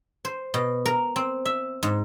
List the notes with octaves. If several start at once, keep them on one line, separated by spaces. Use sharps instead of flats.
C5
B2
A#4
C4
E5
G#2